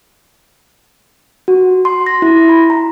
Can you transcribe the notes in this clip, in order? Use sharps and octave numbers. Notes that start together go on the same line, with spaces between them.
F#4
C6
A#6
E4
B5
A#5